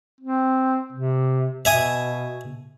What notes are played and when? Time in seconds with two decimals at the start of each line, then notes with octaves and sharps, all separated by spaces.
0.20 C4
0.92 C3
1.65 B2 E5 G#5 D#6